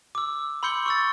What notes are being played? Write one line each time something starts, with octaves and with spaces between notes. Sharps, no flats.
D6 E6
B5 C6 E6 G6 C#7 G7
C#6 E6 A6